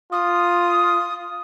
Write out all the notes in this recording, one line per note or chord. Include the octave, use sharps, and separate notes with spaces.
F4 D#6